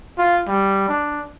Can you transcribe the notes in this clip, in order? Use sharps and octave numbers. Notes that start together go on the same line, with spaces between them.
F4
G3
D4